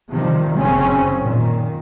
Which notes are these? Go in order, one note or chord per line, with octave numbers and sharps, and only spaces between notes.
C3 D#3 F3 G3
F#1 C#3 C4 C#4
A#2 D#3